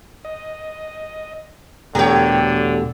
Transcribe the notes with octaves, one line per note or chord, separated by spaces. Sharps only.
D#5
E2 B2 D3 A3 G4 A#4 C#5 G5